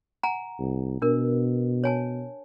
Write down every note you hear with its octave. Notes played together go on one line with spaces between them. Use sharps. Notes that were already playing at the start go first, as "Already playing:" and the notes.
F#5 G#5 A#5
C2
B2 D4 A#4
C#5 G#5 A5